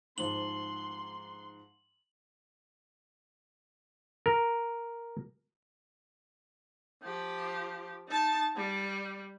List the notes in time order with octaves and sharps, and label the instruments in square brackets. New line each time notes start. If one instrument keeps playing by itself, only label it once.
[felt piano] G#2 F3 [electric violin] C6 [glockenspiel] F#7
[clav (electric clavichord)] A#4
[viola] F3 G4
D#4 A5
G3